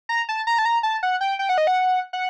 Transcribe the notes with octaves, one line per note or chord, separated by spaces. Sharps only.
A#5
A5
A#5
A5
A#5
A5
F#5
G5
G5
F#5
D#5
F#5
F#5